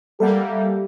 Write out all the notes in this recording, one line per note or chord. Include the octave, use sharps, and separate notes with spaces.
G3 A#3 G4 A4 E5 F#5